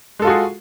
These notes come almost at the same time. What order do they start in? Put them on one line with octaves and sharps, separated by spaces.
G#3 A4 F4 F#4 G#4